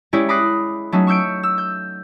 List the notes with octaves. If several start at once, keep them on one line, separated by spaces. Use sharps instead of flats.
G#3 C#4 E4 G4 C#5 D5
B5 D6 D#6 F#6 A#6 C7
F#3 A3 C#4 D#4
C#6 E6 G6 C#7 D7
E6
G6